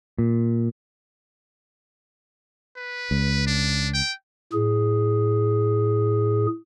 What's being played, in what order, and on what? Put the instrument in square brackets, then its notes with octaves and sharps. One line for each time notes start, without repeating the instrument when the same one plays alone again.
[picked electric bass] A#2
[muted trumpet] B4
[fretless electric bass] C#2
[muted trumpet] D4
G5
[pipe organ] A2 G#4